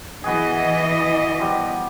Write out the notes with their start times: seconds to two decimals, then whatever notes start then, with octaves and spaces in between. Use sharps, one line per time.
0.24 E3 B3 F#4 G#4 D#5
1.40 F3 G3 B3